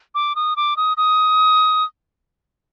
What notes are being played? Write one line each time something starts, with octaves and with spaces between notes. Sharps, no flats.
D6
D#6
D6
D#6
D#6